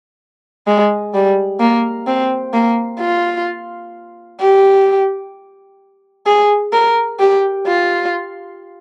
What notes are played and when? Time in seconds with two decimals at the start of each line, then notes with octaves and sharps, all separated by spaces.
0.67 G#3
1.14 G3
1.60 A#3
2.07 C4
2.53 A#3
3.00 F4
4.40 G4
6.26 G#4
6.73 A#4
7.19 G4
7.67 F4